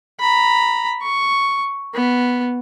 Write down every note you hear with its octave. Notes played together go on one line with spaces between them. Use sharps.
A#5 B5
C#6
B3